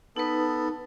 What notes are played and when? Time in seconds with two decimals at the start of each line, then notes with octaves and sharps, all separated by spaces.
0.16 B3 D#4 A4 B4